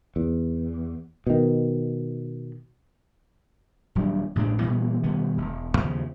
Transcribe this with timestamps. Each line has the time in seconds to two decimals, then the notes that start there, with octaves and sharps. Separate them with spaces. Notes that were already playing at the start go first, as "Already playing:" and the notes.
0.16 E2
1.27 B2 D#3
3.95 D#1 F#3 G3 D4
4.35 A1 A2 G#3 D4
4.59 A#2 E3 G3 B3
5.03 B2 D#3 G3 B3
5.37 E1
5.77 D#2 C#3 F3